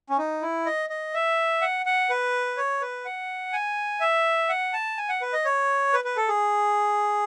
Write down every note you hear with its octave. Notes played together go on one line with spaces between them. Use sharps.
C#4
D#4
E4
D#5
D#5
E5
F#5
F#5
B4
C#5
B4
F#5
G#5
E5
F#5
A5
G#5
F#5
B4
D#5
C#5
B4
B4
A4
G#4